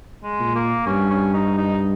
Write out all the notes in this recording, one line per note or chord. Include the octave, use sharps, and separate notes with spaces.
G#3
A#2
A#3
G2 C#4
C#4
D#4
D#4